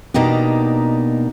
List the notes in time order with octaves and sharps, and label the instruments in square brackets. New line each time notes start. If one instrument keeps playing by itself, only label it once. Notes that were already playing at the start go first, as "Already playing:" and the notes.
[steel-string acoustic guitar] B2 A#3 D4 D#4 G4